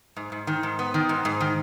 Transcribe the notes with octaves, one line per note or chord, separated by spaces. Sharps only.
G#2
G#2
D#3
G#2
B3
D#3
G#2
G#2
D#3